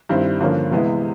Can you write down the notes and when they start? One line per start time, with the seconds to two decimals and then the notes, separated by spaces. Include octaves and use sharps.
0.09 G2 D#3 G3 C4 E4
0.40 G2 D3 F3 A#3 C#4
0.71 C3 E3 G#3 B3 E4